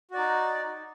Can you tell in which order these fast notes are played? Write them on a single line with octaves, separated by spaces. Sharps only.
F#4 D5 D#4